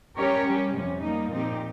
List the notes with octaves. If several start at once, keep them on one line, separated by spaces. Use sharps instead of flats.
G3 C#4 G4 A#4 C#5
G3 C#4 G4
F2 C3 G3 C#4
G3 A#3 D#4
A#2 F3 C4 D#4 G4